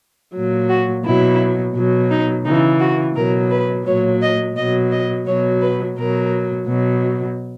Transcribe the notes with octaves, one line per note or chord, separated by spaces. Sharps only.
A#2 F#3
F#4
B2 F#3 E4
B2 F#3
D#4
C#3 E3 D#4
F#4
B2 F#3 A#4
B4
A#2 F#3 C#5
D#5
B2 F#3 D#5
D#5
B2 F#3 C#5
B4
B2 F#3 A#4
B2 F#3